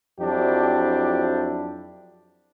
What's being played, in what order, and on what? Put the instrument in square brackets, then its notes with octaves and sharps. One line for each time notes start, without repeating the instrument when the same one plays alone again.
[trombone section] F2 F3 F#3 D4 E4 G4